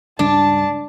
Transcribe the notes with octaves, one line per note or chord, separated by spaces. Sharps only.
C#2 G2 D4 A5